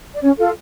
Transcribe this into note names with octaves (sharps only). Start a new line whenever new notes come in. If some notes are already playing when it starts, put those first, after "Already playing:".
D5
C#4 C#5
F4 A4